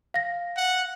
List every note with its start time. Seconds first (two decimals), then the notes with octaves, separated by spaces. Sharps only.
0.14 F5 A#6
0.57 F#5